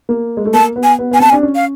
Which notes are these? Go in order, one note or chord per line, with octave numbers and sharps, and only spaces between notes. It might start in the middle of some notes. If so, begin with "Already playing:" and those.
A#3
G#3
A3
A#3 A5
B3
G#5
B3
B3 G#5
C4 A5
G#5
D4
C#4
F5